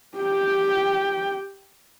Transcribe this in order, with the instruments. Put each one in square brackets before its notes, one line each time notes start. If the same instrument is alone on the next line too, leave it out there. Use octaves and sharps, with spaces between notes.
[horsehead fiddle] G4 G5